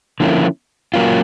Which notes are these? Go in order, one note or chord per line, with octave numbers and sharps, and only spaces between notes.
D3 F3 A#3 C#4 E4
F#3 A#3 C#4 F4